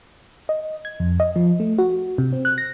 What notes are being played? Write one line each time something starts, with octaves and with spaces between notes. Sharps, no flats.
D#5
G#6
F2
D#5
F3
A3
F#4
C3
C4
F#6
A#6